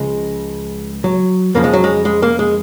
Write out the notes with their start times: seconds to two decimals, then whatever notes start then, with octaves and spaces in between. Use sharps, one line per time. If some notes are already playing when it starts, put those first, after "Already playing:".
Already playing: C#2 C#3 F3 G#3
1.04 F#3
1.55 F2 C#3 F3 A#3
1.64 G#3
1.73 F#3
1.84 G#3
2.05 G#3
2.22 A#3
2.39 G#3